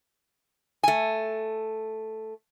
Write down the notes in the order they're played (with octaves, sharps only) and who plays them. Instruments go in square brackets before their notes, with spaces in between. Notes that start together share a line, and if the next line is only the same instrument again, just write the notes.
[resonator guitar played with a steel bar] A3 G#5